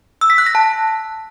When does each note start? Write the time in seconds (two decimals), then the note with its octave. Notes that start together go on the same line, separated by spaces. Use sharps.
0.21 E6
0.30 B6
0.38 F#6
0.46 A#6
0.55 A5